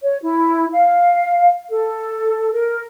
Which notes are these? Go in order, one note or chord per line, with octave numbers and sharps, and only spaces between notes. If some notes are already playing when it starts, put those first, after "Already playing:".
C#5
E4
F5
A4
A#4